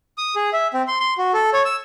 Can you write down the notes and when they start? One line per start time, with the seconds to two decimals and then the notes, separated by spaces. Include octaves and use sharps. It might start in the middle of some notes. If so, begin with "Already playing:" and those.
0.18 D#6
0.36 G#4
0.53 E5
0.74 C4
0.88 C6
1.00 C6
1.18 F#4
1.34 A4
1.53 C#5
1.65 E6